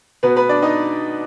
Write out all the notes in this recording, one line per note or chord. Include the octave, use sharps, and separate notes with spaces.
B2 B3 B4
B3 B4
D4 D5
D#4 D#5